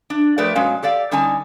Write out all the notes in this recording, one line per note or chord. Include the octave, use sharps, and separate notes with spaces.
D4
F3 A3 G4 A#4 B4 D5
B2 F#3 G#3 C#4 F5
G4 A4 D5 F5
D3 G3 C#4 D#4 G#5 A5